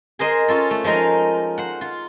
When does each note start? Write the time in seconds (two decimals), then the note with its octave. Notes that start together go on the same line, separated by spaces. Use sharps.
0.19 G#4 A#4 C5 D#5
0.48 C#4 F4 A4
0.71 A3
0.84 F3 G#3 D#4 A#4
1.58 C5 F#5
1.81 F4